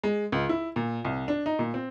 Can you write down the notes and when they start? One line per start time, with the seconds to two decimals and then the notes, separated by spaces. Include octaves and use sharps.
0.04 G#3
0.32 C#2
0.49 E4
0.76 A#2
1.05 C2
1.28 D4
1.46 D#4
1.59 A#2
1.74 C4